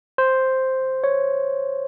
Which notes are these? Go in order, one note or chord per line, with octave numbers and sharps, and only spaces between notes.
C5
C#5